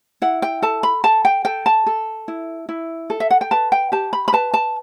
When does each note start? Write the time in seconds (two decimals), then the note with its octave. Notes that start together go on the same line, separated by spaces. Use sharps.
0.22 E4 F#5
0.42 G5
0.62 A4 A5
0.83 B5
1.04 A4 A5
1.25 G5
1.45 A4 G5
1.66 A5
1.87 A4
2.28 E4
2.69 E4
3.10 A4
3.20 E5
3.31 F#5
3.41 G5
3.51 B4 A5
3.72 G5
3.92 G4 A5
4.13 B5
4.28 B5
4.33 B4 A5
4.54 A5